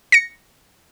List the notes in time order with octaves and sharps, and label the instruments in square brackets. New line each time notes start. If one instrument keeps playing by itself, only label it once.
[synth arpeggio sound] A#6 C#7